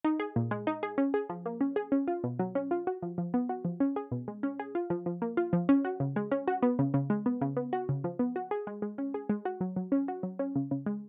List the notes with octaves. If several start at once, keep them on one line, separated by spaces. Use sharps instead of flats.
D#4
G#4
A#2
G#3
D#4
G#4
C#4
G#4
F3
A#3
C#4
G#4
C#4
F4
B2
F#3
C#4
F4
F#4
F3
F3
B3
F#4
F3
C#4
G#4
B2
G#3
C#4
G#4
F4
F3
F3
A#3
F4
F3
C#4
F#4
C#3
G#3
C#4
F#4
B3
C#3
C#3
G#3
B3
C#3
B3
F#4
C#3
F3
B3
F#4
G#4
G#3
G#3
C#4
G#4
G#3
F#4
F#3
F#3
C#4
F#4
F#3
C#4
C#3
C#3
G#3